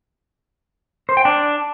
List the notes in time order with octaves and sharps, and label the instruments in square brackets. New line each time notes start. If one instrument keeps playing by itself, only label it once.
[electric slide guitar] C5
G5
D4